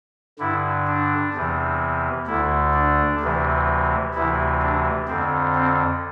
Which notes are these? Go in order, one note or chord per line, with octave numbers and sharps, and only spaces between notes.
G2 D3 E4
D4
E2 C3 E3
D2 D3 E4
D4
D2 C3 E3
D2 C3 E3 E4
D4
F2 D3 C4
C4